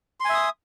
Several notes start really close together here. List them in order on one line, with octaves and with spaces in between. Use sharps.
C6 G#5 E5 D#6